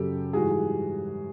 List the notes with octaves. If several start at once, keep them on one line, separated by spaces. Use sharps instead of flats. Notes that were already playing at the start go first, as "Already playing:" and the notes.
Already playing: F#2 C#3 F#3 G4 A4
G#2 E3 G3 F#4 G#4